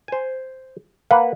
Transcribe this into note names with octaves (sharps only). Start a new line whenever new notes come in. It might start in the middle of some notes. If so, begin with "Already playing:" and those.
C5 G#5
A#3 B4 F5 F#5